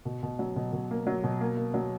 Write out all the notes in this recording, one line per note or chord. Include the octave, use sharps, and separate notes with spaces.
B2
B2
F#3
B2
B2
A#3
F#3
B2
A#3
A#3
F#3